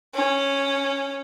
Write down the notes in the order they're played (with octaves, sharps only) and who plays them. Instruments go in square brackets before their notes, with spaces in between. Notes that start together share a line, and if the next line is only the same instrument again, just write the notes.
[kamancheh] C#4